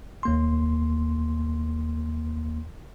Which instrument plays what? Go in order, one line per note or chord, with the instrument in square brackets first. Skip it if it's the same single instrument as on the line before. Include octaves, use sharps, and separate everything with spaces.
[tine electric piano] D#2 A#3 C6